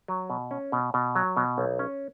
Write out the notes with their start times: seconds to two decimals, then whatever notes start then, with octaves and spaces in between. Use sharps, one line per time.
0.08 F#3
0.30 B2
0.51 C#4
0.72 B2
0.94 B2
1.15 F#3
1.37 B2
1.58 B1
1.79 C#4